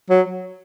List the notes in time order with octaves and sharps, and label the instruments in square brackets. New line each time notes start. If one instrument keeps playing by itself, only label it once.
[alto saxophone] F#3